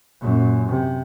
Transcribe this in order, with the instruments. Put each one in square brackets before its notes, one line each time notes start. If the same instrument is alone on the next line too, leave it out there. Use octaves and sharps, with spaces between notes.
[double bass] F#2 A#2
C3